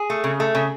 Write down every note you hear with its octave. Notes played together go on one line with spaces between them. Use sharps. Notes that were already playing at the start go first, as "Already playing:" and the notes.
Already playing: G#4
A3
C#3
A3
C#3